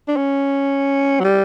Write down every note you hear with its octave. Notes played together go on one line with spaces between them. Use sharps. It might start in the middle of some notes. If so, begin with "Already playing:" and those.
D4
C#4
F#3
G3